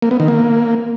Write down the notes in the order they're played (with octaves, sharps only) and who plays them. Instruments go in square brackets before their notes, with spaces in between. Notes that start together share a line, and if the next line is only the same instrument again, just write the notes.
[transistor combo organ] A#3
B3
D#3
A#3